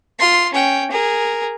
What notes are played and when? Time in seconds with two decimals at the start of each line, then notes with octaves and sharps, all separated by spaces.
0.19 F4 C6
0.53 C#4 G5
0.91 G#4 A#4